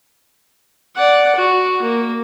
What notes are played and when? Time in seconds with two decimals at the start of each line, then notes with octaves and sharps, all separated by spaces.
0.96 D5 F#5
1.35 F#4
1.82 A#3